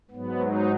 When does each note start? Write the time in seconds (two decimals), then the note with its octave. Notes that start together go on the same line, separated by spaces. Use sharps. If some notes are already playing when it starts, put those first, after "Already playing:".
0.11 G#2 F#3 B3
0.41 D#4